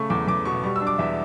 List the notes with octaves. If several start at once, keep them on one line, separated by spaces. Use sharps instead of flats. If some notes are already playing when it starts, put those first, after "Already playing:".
Already playing: C#3 A3 C#6
E2 D6
E2 D6
B2 C#6
G3 C#6
E6
D4
D6
E2 E5